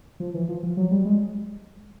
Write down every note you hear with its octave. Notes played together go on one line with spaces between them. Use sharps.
F3
E3
F3
F3
F#3
G3
G#3